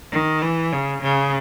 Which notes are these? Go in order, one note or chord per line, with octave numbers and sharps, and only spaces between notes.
D#3
E3
C#3
C#3